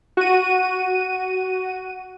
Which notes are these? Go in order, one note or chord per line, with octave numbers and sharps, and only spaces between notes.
F#4 D#7